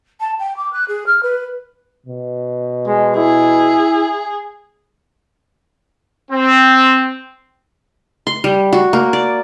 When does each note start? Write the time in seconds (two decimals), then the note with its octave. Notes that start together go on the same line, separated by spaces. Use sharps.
0.20 A5
0.39 G5
0.56 D6
0.72 F#6
0.88 G#4
1.06 F6
1.23 B4
2.06 B2
2.87 G#3
3.17 E4 G#4
6.31 C4
8.27 C6
8.44 G3
8.73 F#4
8.93 A#3
9.13 D5